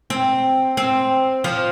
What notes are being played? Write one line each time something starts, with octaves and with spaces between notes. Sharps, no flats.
C4
C4
F3